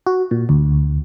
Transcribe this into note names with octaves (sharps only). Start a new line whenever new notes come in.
F#4
A#2
D2